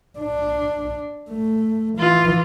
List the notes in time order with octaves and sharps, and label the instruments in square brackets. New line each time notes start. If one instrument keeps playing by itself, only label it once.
[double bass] D4
A3
[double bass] E3 [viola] F4